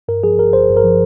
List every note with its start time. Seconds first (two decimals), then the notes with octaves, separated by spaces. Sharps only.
0.08 G2 A#4
0.23 F3 G#4
0.38 G1 A#4
0.53 G1 C5
0.69 G2
0.77 A#4
0.84 F3